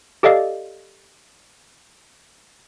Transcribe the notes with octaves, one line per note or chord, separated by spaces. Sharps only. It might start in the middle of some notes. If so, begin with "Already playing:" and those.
G4 A4 D5 D#5 F5